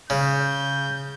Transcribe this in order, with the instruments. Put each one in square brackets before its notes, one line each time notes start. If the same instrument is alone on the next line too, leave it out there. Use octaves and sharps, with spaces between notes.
[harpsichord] C#3 [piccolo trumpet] G6